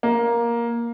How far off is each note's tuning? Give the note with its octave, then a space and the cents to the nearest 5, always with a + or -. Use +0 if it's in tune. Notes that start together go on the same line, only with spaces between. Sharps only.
A#3 +10